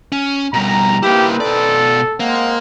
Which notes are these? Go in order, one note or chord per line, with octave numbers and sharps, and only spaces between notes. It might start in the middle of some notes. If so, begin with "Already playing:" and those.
C#4
B2 G3 A#5
A#3 C4 D#4 E4 G4 B4
B2 A4 D5
G#3 A#3 C4 F#5